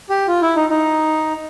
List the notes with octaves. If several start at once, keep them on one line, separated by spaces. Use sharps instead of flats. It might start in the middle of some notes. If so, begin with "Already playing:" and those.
G4
F4
E4
D#4
D#4